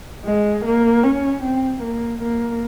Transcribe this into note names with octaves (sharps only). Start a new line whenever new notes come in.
G#3
A#3
C#4
C4
A#3
A#3